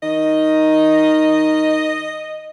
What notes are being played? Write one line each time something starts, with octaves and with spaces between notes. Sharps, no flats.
D#3 D#5